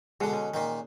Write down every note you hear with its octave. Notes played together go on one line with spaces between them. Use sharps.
B2 D3 G#3 F#5
C#4
A#2 D#3